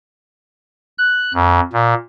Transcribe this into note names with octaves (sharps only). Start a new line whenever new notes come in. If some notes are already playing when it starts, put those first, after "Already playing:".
F#6
F2
A#2